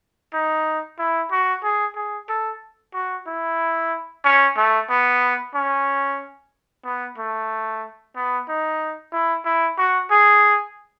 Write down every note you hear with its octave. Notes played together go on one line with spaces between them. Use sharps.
D#4
E4
F#4
G#4
G#4
A4
F#4
E4
C#4
A3
B3
C#4
B3
A3
B3
D#4
E4
E4
F#4
G#4